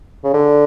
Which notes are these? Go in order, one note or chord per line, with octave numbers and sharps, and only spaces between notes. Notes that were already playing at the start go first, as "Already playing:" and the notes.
C#3
D3